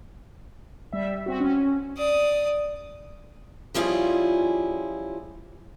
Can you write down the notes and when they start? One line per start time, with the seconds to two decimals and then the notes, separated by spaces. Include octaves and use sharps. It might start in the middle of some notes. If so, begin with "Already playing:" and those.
0.93 G3 E5
1.26 C4 F#4
1.40 C#4
1.97 D5 D#6
3.74 F3 G3 C#4 E4 F4 G#4